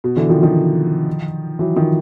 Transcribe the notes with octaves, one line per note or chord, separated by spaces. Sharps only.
B2
D3 E3
D#3 F3
D#3 F3
E3 F#3
D#3 F3